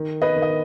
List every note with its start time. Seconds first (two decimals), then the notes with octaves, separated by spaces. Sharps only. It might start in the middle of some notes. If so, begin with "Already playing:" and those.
Already playing: D#3
0.22 B4 D#5
0.36 D#3
0.42 D#5